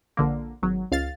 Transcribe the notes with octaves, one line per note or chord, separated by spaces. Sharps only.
A#1 D3 A#3
G#1 F#3
C#2 F5 A6